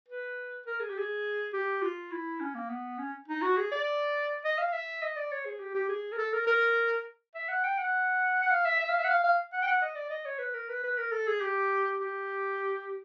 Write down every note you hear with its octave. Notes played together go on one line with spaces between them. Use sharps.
B4
A#4
G#4
G4
G#4
G4
F4
E4
C#4
A#3
B3
C#4
D#4
F#4
G#4
D5
D#5
F5
E5
D#5
D5
C#5
G#4
G4
G4
G#4
A#4
A4
A#4
A#4
E5
F#5
G5
F#5
F#5
F5
E5
E5
F5
E5
F#5
F5
F5
F#5
G5
F#5
D#5
D5
D#5
C#5
B4
A#4
B4
B4
A#4
A4
G#4
G4
G4